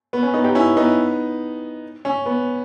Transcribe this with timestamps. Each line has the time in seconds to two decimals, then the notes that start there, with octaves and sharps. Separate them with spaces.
0.13 B3
0.23 C#4
0.34 B3 D#4
0.44 D#4 G4
0.55 C#4 E4
0.77 B3 D#4
2.05 C#4
2.26 B3